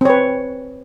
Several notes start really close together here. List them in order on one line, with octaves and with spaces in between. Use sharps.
C4 C#5 B4